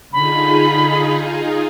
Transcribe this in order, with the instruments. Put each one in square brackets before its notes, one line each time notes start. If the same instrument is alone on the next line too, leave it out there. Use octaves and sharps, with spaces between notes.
[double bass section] D3 [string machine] D#4 F4 G#4 [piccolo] B5